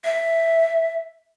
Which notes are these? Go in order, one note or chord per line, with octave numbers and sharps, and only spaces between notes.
E5